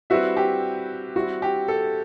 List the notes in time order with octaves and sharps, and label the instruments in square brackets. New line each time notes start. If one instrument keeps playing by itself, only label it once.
[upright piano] G3 C4 E4 B4 E5 [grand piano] F#4
[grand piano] G4
[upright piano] G3 C4 E4 [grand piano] F#4
[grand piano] G4
A4